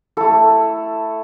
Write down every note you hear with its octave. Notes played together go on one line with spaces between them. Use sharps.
A3 E4 A4